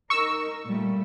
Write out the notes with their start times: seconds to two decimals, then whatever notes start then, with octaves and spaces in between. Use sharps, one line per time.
0.10 D#4 A#4 C#6 E6
0.66 A#2 G3 A3